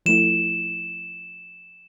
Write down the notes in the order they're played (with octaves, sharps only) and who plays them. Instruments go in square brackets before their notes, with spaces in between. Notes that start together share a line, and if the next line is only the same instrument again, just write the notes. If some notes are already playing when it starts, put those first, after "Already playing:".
[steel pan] F3 A3 E4 [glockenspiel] E7